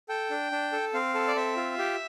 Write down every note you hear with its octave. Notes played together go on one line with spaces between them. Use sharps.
A4 G5
D4
D4
A4
C4 F5
A4
D5
C4 E5
F4
G4